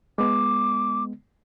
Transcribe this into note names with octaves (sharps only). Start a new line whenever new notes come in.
G#3 B3 D6